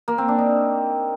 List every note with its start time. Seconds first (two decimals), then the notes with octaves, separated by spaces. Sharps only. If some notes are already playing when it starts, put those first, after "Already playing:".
0.08 A#3
0.18 C4
0.28 D4
0.39 D#4